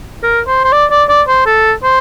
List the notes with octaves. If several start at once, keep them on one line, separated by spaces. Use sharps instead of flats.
A#4
C5
C5
D5
D5
D5
C5
A4
C5